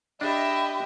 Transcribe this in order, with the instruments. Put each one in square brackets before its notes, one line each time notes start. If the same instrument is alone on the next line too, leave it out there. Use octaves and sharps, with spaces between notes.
[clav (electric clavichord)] D4 [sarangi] G4 [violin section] D#5 E5 [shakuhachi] B5